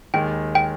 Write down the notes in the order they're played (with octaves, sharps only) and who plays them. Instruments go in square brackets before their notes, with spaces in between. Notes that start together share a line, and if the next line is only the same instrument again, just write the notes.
[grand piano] D#2 D#3 G#3 [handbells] G5
[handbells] G5